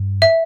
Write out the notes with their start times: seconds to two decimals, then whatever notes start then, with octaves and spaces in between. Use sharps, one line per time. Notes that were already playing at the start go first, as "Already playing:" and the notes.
Already playing: G2
0.22 E5